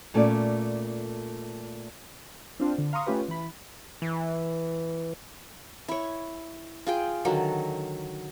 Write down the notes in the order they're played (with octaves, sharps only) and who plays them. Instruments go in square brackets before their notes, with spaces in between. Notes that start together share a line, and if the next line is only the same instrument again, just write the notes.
[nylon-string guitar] A#2 A3 C#4 F4 G4 D5
[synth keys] C4 D4 F4 C5
D3
F5 A#5 C6 C#6 D#6
A3 C#4 F4 G4 B4
E3 B5
[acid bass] E3
[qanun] E4 C#5
F4 G#4 G5
D3 D#3 F#3